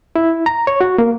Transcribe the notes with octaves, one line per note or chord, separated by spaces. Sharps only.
E4
A#5
C#5
F#4
A#3